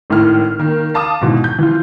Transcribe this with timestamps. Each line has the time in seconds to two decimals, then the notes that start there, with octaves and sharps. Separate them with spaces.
0.10 G#1 A2 E4 F6
0.59 D#3 A#3
0.94 F5 A5 D6 D#6
1.21 G#2 B2 E3
1.44 G6
1.59 E3 F3 F4